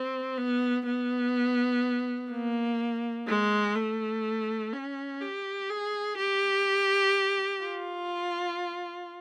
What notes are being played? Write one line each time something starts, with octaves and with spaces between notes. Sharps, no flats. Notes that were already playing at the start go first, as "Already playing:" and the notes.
Already playing: C4
B3
B3
A#3
G#3
A3
C#4
G4
G#4
G4
F4